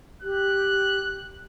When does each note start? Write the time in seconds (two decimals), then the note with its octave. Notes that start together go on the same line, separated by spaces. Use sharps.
0.22 G4 F#6